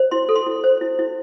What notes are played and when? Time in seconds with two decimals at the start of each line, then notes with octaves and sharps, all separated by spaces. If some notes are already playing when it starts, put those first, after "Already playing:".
Already playing: C5
0.11 E4 C6
0.29 A4
0.35 C6
0.47 E4
0.64 C5
0.81 E4
0.99 E4